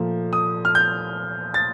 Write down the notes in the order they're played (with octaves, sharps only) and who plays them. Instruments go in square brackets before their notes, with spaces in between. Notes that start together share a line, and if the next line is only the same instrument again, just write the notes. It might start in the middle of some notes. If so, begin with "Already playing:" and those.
Already playing: [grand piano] A#2 F3 A3
D#6
F6
G6
A6